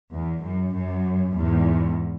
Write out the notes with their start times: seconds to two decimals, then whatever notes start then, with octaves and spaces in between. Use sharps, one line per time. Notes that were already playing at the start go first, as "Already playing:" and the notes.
0.12 E2
0.43 F#2
0.74 F#2
1.36 E2 G#2